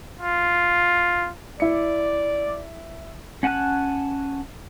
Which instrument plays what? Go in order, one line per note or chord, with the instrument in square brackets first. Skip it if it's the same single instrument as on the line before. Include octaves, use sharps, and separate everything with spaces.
[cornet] F4
[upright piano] E4 C#7 [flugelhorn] D5
[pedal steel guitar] C#4 F#5 G#5 A5 F#6